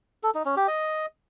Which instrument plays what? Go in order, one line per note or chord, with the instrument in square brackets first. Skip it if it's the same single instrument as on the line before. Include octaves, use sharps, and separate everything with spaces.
[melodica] A4
D#4
C#4
G4
D#5